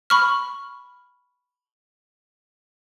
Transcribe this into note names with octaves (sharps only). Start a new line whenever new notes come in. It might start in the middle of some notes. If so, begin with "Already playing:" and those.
B5 C#6 F6